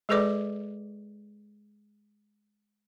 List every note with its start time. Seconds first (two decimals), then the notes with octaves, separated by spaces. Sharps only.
0.09 G#3 G#4 A4 B4 D5 D6